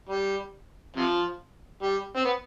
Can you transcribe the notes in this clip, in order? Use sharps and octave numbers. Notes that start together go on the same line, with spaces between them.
G3
C3 F3
G3
C4
B3